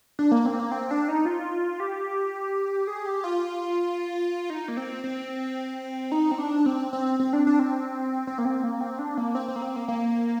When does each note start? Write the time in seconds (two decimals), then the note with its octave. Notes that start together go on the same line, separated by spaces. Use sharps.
0.19 D4
0.32 A#3
0.46 C4
0.59 A#3
0.72 C4
0.91 D4
1.08 D#4
1.25 F4
1.80 G4
2.87 G#4
3.06 G4
3.24 F4
4.50 D#4
4.68 A#3
4.77 C4
5.04 C4
6.12 D#4
6.31 C4
6.38 D4
6.66 C4
6.93 C4
7.20 C4
7.33 D4
7.47 D4
7.59 C4
8.27 C4
8.38 A#3
8.45 C4
8.63 A#3
8.81 C4
8.99 D4
9.17 A#3
9.35 C4
9.48 C4
9.56 A#3
9.62 C4
9.76 A#3
9.88 A#3